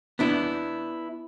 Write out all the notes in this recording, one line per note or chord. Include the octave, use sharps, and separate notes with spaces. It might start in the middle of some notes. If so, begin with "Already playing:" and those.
B3 D4 E4